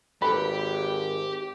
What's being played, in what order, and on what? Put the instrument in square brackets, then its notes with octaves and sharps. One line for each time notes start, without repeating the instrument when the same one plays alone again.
[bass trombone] G#1 [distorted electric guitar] G4 [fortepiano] A4 B4 B5